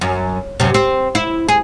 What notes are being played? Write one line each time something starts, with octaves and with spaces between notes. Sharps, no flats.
F#2
F#2 C3
C4
E4
G#4